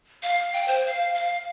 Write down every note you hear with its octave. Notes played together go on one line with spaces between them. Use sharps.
F5
G5
C5
F5
F5